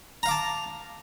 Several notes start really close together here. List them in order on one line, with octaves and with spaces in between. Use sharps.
A#5 F5 D6 A5